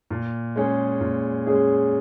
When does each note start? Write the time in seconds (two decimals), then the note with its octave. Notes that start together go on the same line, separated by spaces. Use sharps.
0.11 A#2
0.56 G#3 C#4 G#4
1.01 A#2
1.46 G#3 C#4 G#4